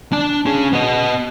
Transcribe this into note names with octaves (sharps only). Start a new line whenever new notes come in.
D4 A5
C#4 G#4
B3 D#5